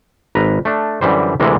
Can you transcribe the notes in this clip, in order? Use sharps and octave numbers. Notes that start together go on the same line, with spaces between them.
G#1 B4 A#5
A3 D4
F#2 D3 E3 G3 C5
D2 C3 E3 G#3 A#3 A4